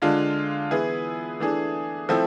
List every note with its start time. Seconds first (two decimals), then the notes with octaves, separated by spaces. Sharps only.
0.02 D3 G#3 D4 F4
0.71 E3 B3 E4 G#4
1.40 E3 A3 D4 G#4
2.09 F3 A3 C4 E4